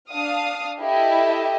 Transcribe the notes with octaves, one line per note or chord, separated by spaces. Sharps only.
D4 F5 D#6
E4 G4 A4 D#5 E5